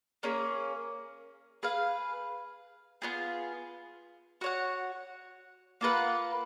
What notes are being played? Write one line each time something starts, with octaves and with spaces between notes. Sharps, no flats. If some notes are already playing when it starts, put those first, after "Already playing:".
A#3 C#4 G#4
G#4 B4 F5
B3 F4 G#4
F#4 C#5 F#5
A#3 F4 B4 F#5